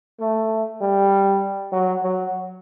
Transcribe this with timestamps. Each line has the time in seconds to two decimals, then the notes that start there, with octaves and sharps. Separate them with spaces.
0.20 A3
0.81 G3
1.72 F#3
2.03 F#3